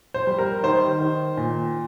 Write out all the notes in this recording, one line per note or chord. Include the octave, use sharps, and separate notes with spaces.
C5
G3
A#4
D#3 C5
D#3
A#2